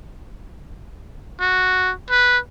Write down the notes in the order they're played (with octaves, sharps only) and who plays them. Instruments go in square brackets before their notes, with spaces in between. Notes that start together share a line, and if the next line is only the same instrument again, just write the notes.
[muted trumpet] F#4
B4